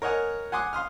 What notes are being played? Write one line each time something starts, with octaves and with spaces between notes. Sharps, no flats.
A#4 C#5 D#5 F#5 G#5
F#5 G#5 C6 D6 D#6 F#6
F5 C6 D#6 F6